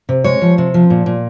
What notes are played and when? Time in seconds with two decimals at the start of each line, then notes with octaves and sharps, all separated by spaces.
0.09 C3
0.24 G#3 C#5
0.42 F3
0.58 C3
0.74 F3
0.90 A#2
1.06 A#2